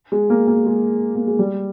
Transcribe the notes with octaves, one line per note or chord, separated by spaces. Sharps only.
G#3
A#3
A#3
G#3
A#3
G#3
G3